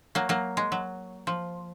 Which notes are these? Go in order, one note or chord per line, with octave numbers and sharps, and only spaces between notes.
F#3 A#3
F#3 A#3
G#3
F#3
F3